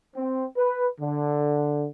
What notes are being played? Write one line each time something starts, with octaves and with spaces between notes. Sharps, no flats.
C4
B4
D3